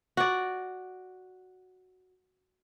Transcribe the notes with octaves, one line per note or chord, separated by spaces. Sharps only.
F#4 D5